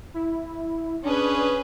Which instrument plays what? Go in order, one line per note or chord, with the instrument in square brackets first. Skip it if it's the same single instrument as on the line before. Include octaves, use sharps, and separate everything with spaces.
[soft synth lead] E4
[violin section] C#4 G#4 B4 [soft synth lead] D4